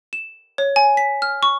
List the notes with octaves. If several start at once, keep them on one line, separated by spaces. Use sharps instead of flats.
E7
C#5
G#5
B6
F6
C#6